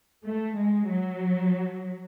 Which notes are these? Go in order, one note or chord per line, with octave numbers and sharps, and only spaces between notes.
A3
G#3
F#3